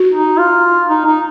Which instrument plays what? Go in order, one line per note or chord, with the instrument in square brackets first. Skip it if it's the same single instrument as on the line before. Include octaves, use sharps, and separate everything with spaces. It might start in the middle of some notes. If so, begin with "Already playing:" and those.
Already playing: [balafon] F#4
[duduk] D#4
F4
D#4
D#4